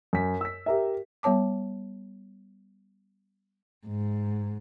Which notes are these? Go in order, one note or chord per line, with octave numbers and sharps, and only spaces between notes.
F#2 B6
E6 B6
G4 A#4 E5
G3 B3 C#5 A5 D6
G#2